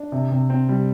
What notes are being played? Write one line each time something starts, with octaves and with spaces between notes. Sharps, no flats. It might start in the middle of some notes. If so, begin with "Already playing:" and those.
Already playing: D4
C3
C3
C4
G3